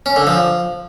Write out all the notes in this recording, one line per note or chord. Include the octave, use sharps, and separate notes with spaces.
C#4
D3
F3